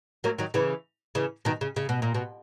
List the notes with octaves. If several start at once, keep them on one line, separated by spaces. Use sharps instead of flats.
F#3 A#3
D#3 F#3
C#3 E3
C#3 E3
B2 D#3
C#3
C#3
B2
A#2
B2